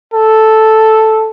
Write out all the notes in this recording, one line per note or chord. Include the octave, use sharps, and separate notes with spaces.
A4